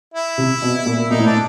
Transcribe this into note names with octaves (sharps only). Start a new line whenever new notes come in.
E4
C3
B2
A#2
A#2 D#4
A2
D4